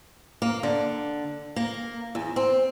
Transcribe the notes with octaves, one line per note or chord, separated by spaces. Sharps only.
A#3
D3
A#3
E2
C4